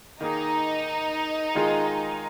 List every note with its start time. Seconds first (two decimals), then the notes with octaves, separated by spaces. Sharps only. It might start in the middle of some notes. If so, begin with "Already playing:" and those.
0.21 D#3 A#3 D#4 G#4
1.55 D#3 G#3 F4 G#4